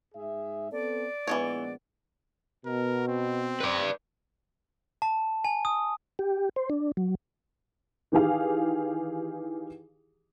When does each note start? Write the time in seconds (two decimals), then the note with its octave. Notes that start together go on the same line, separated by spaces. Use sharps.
0.15 G#2 G#4 E5
0.72 B3 C4 A4 D5
1.27 A#1 E3 G#3 A3 B3 C#5
2.66 B2 A#4
3.08 C4
3.61 B4 D5
5.02 A5
5.44 G#5
5.65 D#6
6.19 G4
6.56 C5
6.70 D4
6.97 F#3
8.12 D#3 E3 G4 G#4 F5